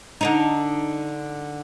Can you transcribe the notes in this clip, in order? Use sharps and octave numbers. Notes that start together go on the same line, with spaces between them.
D3 D4 D#4